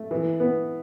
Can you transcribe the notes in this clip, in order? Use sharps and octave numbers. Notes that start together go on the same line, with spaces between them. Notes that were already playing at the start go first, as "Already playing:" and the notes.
Already playing: A3
E3
B3